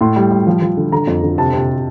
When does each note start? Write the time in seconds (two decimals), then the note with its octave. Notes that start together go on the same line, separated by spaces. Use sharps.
0.01 A2 C6
0.16 G3
0.31 G3
0.47 F3
0.62 F3
0.77 D3
0.92 D3 A#5
1.07 F2
1.23 D3
1.38 C3 A5
1.54 C3